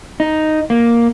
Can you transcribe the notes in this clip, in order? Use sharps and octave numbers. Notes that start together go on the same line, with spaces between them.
D#4
A#3